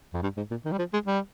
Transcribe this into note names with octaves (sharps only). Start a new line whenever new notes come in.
F2
G2
G#2
A#2
D#3
G3
F3
G#3
G3